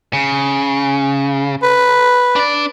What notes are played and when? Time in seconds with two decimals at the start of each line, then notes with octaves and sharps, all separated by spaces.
0.13 C#3
1.63 B4
2.36 D4 D5